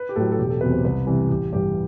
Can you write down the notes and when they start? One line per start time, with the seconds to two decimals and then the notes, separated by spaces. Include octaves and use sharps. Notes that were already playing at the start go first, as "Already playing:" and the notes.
Already playing: B4
0.09 G4
0.16 A2 F#3 A4
0.32 A4
0.38 E1 G4
0.50 A4
0.61 E2 C3 F#3 B4
0.73 C5
0.84 C2 B4
1.07 C3 E3 G3
1.30 A1 G4
1.52 G2 E3 G3 G4